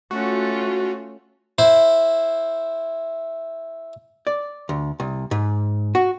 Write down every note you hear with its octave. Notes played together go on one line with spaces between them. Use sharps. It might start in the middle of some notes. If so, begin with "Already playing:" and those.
A3 C#4 F4 F#4
E4 C5
D5
D2
C2
G#2
F#4